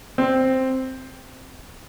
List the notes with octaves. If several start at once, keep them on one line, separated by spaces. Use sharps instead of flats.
C4